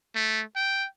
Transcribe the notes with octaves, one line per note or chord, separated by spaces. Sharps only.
A3
G5